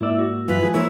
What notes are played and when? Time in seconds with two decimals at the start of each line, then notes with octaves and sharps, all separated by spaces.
0.01 G#2 A#3 E4 D5 E5 E6
0.19 F#4
0.48 F#2 E3 F4 B4
0.63 E3 F3 G#3 G#4
0.74 F3 A#3 C#4 E4 A#4 C5 C#5